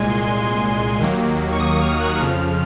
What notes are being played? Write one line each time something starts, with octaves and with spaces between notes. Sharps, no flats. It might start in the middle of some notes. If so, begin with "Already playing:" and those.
Already playing: C2 A#2 G#3 G#5
C6
C6
D#2 D#3 F#3 A#3
C#6
D#6
F6
F#6
F2 C#3 F3 F6